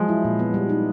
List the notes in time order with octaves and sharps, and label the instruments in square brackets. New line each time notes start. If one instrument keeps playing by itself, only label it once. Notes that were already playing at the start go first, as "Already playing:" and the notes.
Already playing: [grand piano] F3 G#3 [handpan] F#3
[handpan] E4
A#2
B3
G3
D#4